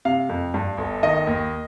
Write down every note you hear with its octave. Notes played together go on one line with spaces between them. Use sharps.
C3 F5
F2
G2
G1
D#3 D#5
D#2